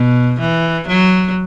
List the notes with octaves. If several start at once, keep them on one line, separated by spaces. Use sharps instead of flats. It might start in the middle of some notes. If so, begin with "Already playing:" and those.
Already playing: B2
E3
F#3